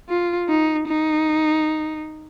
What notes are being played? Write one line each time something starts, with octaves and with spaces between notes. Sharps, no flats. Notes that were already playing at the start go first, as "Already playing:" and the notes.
F4
D#4
D#4